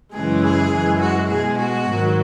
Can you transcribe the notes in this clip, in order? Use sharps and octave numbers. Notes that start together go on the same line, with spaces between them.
F#2 C#3 E3 G#3 G#4
G#4
F#2 E3 G#3
F#4
B2 G#3 G#4
F#4
G#2 D#3 F#3